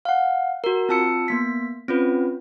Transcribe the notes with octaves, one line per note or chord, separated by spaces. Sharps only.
F5 F#5
F#4 A#4
C4 F4 A5 E6 C#7
A#3 B3 B6
C4 C#4 F4 B4